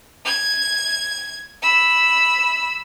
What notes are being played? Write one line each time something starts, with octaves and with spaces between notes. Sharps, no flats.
G#6
B5 E6